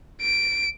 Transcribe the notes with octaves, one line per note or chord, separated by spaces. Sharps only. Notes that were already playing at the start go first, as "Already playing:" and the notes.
D7